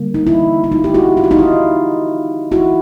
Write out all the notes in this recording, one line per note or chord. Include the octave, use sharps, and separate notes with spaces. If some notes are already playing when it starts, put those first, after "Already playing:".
Already playing: D3 G3 A#3
D#4
E4
E4
D#4 F4
G4
E4 F#4
F4
F#4
D#4 F4
E4
E4 F#4